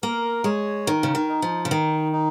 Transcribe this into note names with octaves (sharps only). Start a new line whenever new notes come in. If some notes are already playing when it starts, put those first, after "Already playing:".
A#3 A#4
G#3 C#5
D#3 A#4
C#3
D#3
D#4
F3
C#3
D#3 D#4
D#4